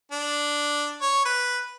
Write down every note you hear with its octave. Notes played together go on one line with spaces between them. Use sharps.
D4
C#5
B4